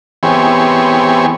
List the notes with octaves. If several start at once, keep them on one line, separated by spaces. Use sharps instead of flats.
E3 B3 C4 G4 G#4 C#5